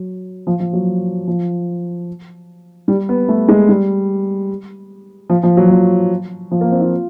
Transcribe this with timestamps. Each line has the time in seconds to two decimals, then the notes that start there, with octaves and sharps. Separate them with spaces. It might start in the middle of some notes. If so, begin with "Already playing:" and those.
Already playing: F#3
0.47 F3
0.60 F3
0.73 F#3
1.28 F3
2.88 G3
3.09 B3
3.29 A3
3.48 G#3
3.69 G3
5.30 F3
5.43 F3
5.57 F#3
5.70 F3
6.51 F3
6.61 A#3
6.71 C4
6.81 F4